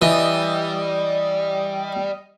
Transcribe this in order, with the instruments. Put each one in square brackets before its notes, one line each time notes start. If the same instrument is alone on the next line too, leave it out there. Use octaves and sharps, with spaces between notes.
[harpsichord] E3 [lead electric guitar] G3 [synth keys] D#5